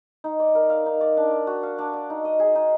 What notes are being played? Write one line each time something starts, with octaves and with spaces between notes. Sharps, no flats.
D#4
D5
A#4
F5
D#4
D5
D4
D5
F#4
F5
D4
D5
D#4
D#5
G#4
D#4